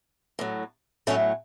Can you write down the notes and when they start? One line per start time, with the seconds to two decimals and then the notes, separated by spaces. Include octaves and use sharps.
0.39 A2 F#3
1.07 A2 F#3 A3 C#4